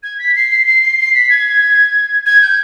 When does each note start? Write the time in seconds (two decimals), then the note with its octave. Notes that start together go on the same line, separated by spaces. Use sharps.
0.03 G#6
0.19 B6
0.35 C7
0.51 C7
0.66 C7
0.82 C7
0.98 C7
1.14 B6
1.30 G#6
2.26 G#6
2.41 G6